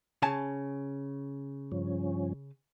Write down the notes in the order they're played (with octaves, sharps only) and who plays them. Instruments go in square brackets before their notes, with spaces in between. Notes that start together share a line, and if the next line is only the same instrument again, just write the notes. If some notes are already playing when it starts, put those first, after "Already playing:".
[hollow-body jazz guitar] C#3 G#5 A5
[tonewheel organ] G2 F3 C#4